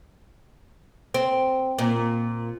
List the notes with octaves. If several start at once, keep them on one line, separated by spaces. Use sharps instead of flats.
C4
A#2